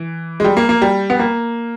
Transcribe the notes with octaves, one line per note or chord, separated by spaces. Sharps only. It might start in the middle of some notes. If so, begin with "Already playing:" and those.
Already playing: E3
G#3
G3
A#3
A#3
G3
B3
A#3